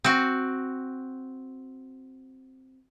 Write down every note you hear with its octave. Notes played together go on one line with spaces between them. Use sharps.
C4 F#4